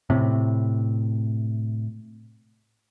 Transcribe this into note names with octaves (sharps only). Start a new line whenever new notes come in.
A2 C3